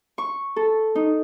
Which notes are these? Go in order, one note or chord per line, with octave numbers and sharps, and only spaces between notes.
C#6
A4
D#4